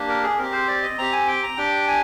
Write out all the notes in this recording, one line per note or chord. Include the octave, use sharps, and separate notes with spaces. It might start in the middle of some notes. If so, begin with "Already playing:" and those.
Already playing: A#3 D4 G4
A#4
G#4
C4 G4 A#4
C5
D5
D#5
C4 G4 A#5
G#5
G5
A#5
D4 G4 G5
G#5